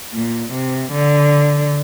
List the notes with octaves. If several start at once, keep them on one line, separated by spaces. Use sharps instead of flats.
A#2
C3
D3